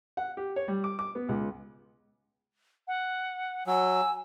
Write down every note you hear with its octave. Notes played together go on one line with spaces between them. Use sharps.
F#5
G4
C#5
G3
D6
D6
B3
C#2
F#5
F#3 G#5 E6